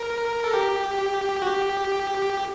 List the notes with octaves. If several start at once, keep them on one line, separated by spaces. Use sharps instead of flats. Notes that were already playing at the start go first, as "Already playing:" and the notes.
Already playing: A#4
A4
G4
F#4
G4